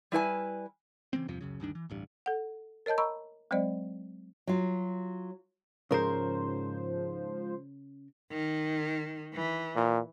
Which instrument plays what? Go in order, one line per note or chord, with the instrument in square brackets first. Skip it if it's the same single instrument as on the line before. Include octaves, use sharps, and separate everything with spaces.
[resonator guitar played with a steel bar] G3 E4 B4 G#5
[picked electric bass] C#3 E3 A#3 C4
E2 G2 C3 F3
C#2 F#2 C#3
D2 G2 D#3 D4
E3
D1 A1 G2
[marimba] A4 F#5
A#4 C#5 D#5 A5 G6
D#5 A#5 B5 C#6 E6
F#3 G#3 C4 C5 D5 D#5
[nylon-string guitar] F#3 F4
[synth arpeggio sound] G#2 F3 C5 [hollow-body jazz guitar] C#3 A#4
[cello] D#3
E3
[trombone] A#2